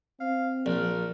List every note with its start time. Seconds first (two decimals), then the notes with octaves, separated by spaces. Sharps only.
0.20 C4 F5
0.66 A#1 A#4 D5